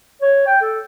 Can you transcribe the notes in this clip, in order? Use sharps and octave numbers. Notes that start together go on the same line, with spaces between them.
C#5
G5
A4